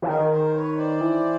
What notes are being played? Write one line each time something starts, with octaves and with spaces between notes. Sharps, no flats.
E3
D#3 G#4 A#4
A#4 C5
B4 C#5
C5 D5
E3